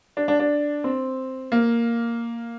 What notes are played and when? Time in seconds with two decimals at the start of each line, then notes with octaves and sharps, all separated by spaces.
0.17 D4
0.28 D4
0.40 D4
0.84 C4
1.52 A#3